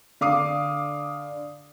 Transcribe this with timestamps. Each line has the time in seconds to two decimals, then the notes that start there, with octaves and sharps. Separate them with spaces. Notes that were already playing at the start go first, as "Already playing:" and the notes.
0.21 D3 F5 D6 D#6 C7